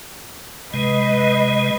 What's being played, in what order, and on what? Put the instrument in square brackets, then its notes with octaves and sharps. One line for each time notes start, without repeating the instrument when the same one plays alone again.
[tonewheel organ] C3 G#3 [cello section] B4 D#5